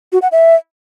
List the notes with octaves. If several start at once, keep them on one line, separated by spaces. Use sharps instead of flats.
F#4
F#5
E5